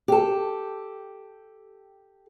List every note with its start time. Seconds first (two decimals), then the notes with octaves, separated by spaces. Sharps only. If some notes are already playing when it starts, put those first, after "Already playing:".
0.08 G4 A4